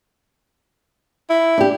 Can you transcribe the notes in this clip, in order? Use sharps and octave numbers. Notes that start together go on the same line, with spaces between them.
E4
D4 G4